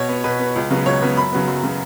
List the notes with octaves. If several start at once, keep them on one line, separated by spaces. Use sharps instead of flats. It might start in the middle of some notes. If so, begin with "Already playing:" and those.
Already playing: B2 C#5
B3
B2 B4
B3
C#2
C#3 F#3 B3
C#2 C#5
C#3 F#3 B3
F#2 B5
C#3 F#3 B3
F#2
C#3 F#3 B3